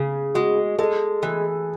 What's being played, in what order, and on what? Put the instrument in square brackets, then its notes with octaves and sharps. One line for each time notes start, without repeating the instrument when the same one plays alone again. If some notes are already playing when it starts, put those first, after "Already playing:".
Already playing: [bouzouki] C#3 [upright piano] G#4
[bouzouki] G#3 [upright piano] F#4
[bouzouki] G#3 [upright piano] A4
[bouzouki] E3 [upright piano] G#4